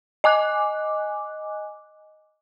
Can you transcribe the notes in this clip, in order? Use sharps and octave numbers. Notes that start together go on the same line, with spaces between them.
D#5 G#5 D6 F#6